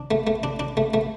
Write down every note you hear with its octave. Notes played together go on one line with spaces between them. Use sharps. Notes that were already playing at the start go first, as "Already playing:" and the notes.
Already playing: D4
A3
A3
D4
D4
A3
A3